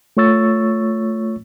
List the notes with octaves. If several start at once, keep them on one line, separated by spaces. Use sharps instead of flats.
A3 F4 C#5 C#6 E6 A6